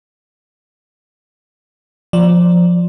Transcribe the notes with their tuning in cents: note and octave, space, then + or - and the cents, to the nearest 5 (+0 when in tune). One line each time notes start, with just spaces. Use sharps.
F3 +5 D5 +0